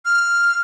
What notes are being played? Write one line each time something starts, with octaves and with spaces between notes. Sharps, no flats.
F6